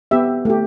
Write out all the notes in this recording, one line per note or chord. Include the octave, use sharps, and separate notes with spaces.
B3 G4 E5
A3 G4